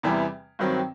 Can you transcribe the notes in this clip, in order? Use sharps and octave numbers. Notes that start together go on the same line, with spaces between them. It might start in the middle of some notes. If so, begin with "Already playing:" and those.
E2 C3 E3 G3
G2 D#3 F#3 C4